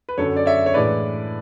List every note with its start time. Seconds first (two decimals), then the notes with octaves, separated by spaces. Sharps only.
0.09 B4
0.18 F#2 D3 F#3 C#4 A4 C#5
0.36 D5
0.46 C#5 E5
0.66 C#5
0.74 A2 E3 G#3 D4 B4 D5